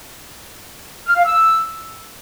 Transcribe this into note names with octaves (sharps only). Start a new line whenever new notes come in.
F6
F5
E6